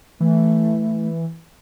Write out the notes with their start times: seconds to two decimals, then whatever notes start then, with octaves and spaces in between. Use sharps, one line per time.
0.21 E3 A3